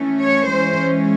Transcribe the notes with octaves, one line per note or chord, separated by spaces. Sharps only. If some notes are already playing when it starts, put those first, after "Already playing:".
Already playing: E3 A3 C#4
C#5
E3 G#3 C#4 C5